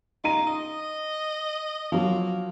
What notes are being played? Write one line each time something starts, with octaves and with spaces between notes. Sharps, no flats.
D#4 F4 A#5 D#7
D#5 D#6
F3 F#3 A#3